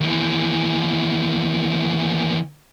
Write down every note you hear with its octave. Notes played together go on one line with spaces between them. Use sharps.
D#2 E3